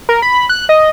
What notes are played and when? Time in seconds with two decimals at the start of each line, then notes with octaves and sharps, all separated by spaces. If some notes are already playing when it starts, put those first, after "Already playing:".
0.09 A#4
0.22 B5
0.49 F#6
0.69 D#5